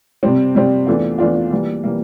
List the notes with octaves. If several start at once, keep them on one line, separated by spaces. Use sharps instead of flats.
C3 G3 C4
C3 G3 C4
E2 E3 A3 D4 F4
E2 E3 A3 D4 F4
E3 G3 A#3
E3 G3 A#3